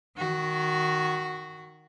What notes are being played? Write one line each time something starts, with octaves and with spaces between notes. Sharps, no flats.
D#3 F#4